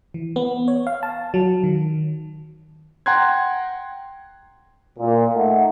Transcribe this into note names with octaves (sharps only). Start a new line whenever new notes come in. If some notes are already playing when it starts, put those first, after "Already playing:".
E3
B3
C#5
F5
A5
F#3
D#3
F#5 G5 A#5 C6 F#6 G#6
A#2
A3 D#4 D#5 F#5